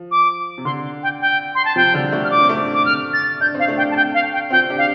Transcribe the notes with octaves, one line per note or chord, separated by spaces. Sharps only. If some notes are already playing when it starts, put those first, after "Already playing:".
Already playing: F3
D6
C3
D3 C6
G5
G5
C6
A5
C3 F3 G5
D3 G3
A3 D4
F6
D4 D6
C4
A3 D4
D6
F6
A6
D4 G6
C4 F5
A3 D4
G5
A5
G5
F5
G5
C4 F4 G5
D4 G4
F5